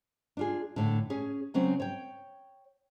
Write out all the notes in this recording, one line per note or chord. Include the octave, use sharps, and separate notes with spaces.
D4 F4 G#4
A2 D3
C#4 G#4
C#3 F#3 C4 C#4
C#5 G5